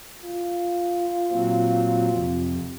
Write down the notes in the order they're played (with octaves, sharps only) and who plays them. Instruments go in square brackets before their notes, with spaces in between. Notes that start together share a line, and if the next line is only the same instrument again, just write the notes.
[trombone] F4
[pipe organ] A#2 F#3 C4
F2 C3